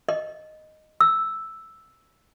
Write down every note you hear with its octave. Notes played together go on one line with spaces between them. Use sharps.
D#5
E6